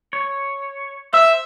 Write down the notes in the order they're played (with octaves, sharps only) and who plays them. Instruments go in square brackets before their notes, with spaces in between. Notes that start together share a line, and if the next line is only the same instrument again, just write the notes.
[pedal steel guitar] C#5
[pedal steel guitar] C5 E6 [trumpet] E5